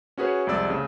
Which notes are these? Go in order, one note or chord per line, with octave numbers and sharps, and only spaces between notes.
C#4 F#4 G#4 B4 C#5
C2 F2 G#3 D5 E6 A6
C#3 A3